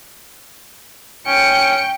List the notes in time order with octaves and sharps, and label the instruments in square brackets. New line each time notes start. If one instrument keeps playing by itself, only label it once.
[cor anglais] C#4 [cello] G5 [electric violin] C#7